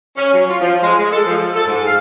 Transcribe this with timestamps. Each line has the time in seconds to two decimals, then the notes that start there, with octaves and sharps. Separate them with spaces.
0.17 C#4
0.34 F#3
0.49 F4
0.61 F3
0.83 G#3
0.99 G#3
1.12 A4
1.27 F3
1.38 F3
1.55 A4
1.67 G#2
1.86 F5